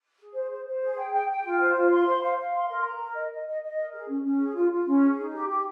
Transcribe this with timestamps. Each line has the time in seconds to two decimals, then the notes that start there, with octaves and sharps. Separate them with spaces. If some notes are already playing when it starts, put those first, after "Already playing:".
0.20 G#4
0.34 C5
0.50 C5
0.66 C5
0.82 G#4
0.97 G5
1.12 G5
1.29 G5
1.44 F4
1.60 C5
1.74 F4
1.91 C6
2.06 C5
2.21 F5
2.37 F5
2.53 C6
2.69 A#4
2.84 A#5
3.00 A#4
3.15 D#5
3.31 D#5
3.46 D#5
3.62 D#5
3.77 A#4
3.93 G#4
4.09 C#4
4.23 C#4
4.39 G#4
4.55 F4
4.70 F4
4.86 C#4
5.02 G#4
5.17 D#4
5.33 G4
5.49 G4